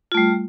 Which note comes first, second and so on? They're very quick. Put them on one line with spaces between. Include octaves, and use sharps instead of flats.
F4 A3 G3